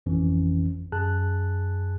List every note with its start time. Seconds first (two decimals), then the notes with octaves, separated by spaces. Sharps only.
0.06 G#1 F2 E3 C#4
0.92 F#2 G#4 A5 F#6